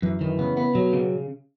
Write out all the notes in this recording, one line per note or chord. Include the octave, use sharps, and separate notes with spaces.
F#2 E3
D#3 E3
C#3 B3
B3
B2 F#3
C#3